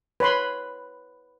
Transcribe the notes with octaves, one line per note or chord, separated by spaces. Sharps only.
B4 C#5 B5 C6